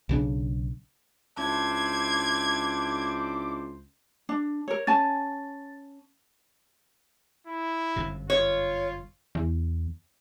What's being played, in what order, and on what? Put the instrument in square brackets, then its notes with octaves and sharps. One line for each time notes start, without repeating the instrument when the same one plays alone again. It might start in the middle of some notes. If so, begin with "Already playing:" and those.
[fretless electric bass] B1 C#3 D4
[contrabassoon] C#2 [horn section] D4 E4 C5 [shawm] D6 [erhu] G#6
[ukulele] D4
A#4 C#5
[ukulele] C#4 G#5 A5 [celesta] A6
[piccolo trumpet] E4
[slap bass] G1 F#2 C3
[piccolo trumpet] F4 [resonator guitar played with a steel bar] C#5
[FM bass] E2